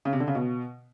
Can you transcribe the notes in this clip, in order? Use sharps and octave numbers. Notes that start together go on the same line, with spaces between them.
C#3
C3
D3
C#3
B2